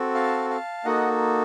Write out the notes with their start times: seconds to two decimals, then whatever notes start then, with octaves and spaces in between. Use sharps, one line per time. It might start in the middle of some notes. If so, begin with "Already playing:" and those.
Already playing: C4 F#4 A4
0.14 F5 A5
0.50 F5 A5
0.85 A#3 D#4 F#4 A4 D#5 F#5